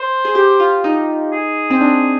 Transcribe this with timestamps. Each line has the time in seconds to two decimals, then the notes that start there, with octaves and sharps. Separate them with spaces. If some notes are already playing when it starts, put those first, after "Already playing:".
Already playing: C5
0.25 G#4
0.35 G4
0.60 F4
0.84 D#4
1.33 G#4
1.70 C4
1.81 D4